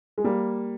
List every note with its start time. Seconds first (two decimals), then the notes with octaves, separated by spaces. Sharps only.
0.18 G#3
0.24 G3 A#3